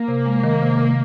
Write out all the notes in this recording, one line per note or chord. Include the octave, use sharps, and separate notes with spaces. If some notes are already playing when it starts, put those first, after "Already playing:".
Already playing: A#3
C3
G#3
D#3
C3
C3